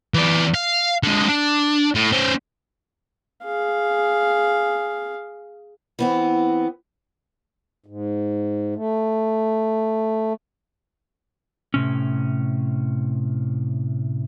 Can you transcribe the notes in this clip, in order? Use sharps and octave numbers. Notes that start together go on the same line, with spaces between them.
E3 D5
F5
D3 G#3
D4
A2
C#4 C5
G#4 F5
E3 B3 C4
G#2
A3
A2 C3 C#4